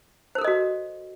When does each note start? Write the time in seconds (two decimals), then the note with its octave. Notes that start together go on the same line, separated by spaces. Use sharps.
0.35 C5
0.38 A#4
0.41 A4
0.45 D#5
0.48 F#4